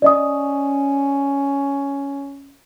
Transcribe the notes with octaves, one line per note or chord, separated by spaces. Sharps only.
C#4 D5 D#5 D#6